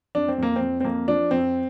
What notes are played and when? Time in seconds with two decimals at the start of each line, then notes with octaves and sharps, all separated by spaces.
0.15 F2 D4
0.28 C4
0.38 F2 A#3
0.56 F2 C4
0.80 C4
0.84 F2 A#3
1.08 F3 D4
1.31 F2 C4